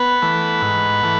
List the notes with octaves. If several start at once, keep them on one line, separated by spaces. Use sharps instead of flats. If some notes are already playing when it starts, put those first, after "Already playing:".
Already playing: B3 B4
E3 A3
G#2
E3 A3